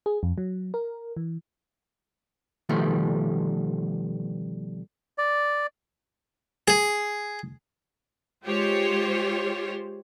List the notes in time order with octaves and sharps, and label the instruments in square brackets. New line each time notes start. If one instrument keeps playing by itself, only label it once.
[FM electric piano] G#4
F2
F#3
A#4
E3
[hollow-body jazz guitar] B2 D#3 F3 G3 A3
[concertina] D5
[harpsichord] G#4
[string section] G#3 F4 G4 C5 C#5